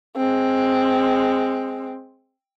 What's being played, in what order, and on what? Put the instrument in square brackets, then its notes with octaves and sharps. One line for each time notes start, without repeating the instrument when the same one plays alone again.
[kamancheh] G#3 C4